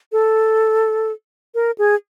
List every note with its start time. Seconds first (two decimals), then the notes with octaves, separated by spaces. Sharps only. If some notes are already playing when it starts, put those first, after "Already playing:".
0.12 A4
1.55 A#4
1.78 G#4